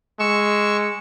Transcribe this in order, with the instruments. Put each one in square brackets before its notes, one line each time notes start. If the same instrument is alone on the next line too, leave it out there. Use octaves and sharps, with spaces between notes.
[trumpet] G#3 [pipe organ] C#6 E6